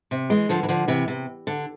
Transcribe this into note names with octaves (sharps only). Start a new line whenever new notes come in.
C3
E3 G#3
D3 F3
E3
D3 F3
C3 E3
C3
D3